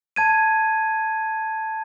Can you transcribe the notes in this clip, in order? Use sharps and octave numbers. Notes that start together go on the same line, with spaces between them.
A5 G#6 D#7